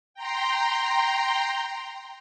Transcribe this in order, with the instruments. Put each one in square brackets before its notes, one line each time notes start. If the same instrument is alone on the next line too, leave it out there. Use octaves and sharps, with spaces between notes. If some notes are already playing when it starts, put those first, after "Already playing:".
[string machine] G5 A#5 C6